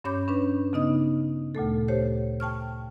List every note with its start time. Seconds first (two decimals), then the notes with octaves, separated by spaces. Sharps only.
0.04 G2 C#4 C#5 B5 D6 G6
0.28 C#4 D4 B4
0.73 C#3 B3 D#4 D#5 D#6
1.55 D2 A#2 A3 A4
1.88 G4 C5 C#5
2.40 G5 A5 C#6 F6